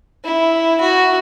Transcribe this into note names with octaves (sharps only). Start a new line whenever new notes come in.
E4
F#4